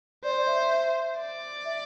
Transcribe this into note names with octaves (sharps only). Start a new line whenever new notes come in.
C5 D5
D5
E5
D5
E5